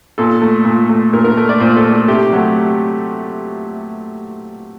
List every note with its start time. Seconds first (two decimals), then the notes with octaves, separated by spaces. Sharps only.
0.18 A#2 A4
0.42 A3
0.65 A#2
0.89 A3
1.13 A#2 A#4
1.25 A#4
1.37 A3
1.49 D5
1.60 A#2 C5
1.77 A4
1.84 A3
1.92 A4
2.08 C3 G4
2.32 F#3 A3